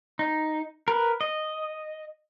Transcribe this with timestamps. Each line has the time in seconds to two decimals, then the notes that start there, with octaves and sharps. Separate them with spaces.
0.19 D#4
0.88 A#4 B4
1.21 D#5